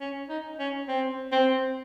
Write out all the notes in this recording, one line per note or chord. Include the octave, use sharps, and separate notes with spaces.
C#4
D#4
C#4
C4
C4